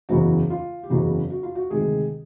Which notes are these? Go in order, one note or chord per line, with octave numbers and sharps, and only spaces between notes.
F#1 E2 C#3 E3 F#4
F4
G4
F#1 E2 C#3 E3 F#4
F#4
F4
F#4
D2 C3 D#3 G#3 G#4